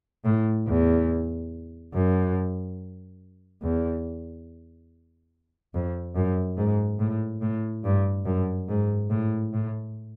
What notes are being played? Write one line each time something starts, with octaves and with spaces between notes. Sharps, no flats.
A2
E2
F#2
E2
F2
F#2
G#2
A2
A2
G2
F#2
G#2
A2
A2